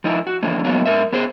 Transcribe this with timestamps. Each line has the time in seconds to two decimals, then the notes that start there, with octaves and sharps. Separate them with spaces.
0.04 F3 D#4 E4
0.27 F#4
0.43 D3 E3 F3 A#3
0.64 F#3 A#3 B3 D#4 F#4
0.86 G#2 A#4 E5
1.13 B3 G#4 C5